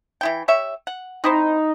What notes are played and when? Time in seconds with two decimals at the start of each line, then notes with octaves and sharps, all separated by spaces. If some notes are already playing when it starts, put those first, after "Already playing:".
0.21 E3 E4 G5
0.48 G4 C#5 E5
0.87 F#5
1.24 C4 D#4 E4 C5